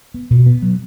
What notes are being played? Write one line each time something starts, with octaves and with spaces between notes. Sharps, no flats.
B3
B2
B3
F#3